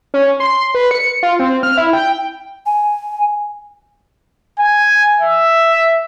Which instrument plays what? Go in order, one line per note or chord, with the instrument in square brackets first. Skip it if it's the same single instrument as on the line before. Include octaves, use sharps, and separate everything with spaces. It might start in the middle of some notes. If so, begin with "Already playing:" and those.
[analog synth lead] C#4
C6
B4
C#7
F4
C4
F6
E4
G5
[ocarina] G#5
[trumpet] G#5
E5